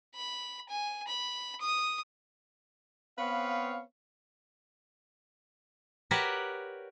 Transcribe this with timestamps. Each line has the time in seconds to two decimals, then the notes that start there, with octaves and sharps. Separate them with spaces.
0.15 B5
0.69 G#5
1.08 B5
1.61 D#6
3.18 B3 C4 B4 C#5 F5
6.11 F#4 G4 A#4 B4 C#5 D5